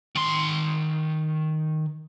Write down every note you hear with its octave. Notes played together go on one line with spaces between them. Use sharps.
D#3 C6